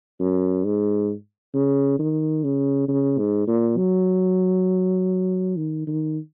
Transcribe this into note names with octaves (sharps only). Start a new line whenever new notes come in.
F#2
G#2
C#3
D#3
C#3
C#3
G#2
A#2
F#3
D#3
D#3